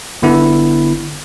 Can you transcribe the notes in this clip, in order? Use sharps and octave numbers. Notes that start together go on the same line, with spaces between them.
G1 D3 B3 E4